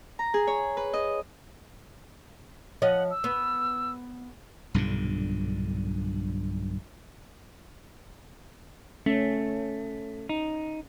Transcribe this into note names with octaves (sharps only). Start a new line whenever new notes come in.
A#5
G#4
C#5
B4
D#5
F3 C#5 D#5 F#5
E6
B3
B1 G2 A#2 D3
A3 C#4
D#4